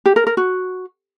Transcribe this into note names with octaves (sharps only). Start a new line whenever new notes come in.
G4
A#4
A#4
F#4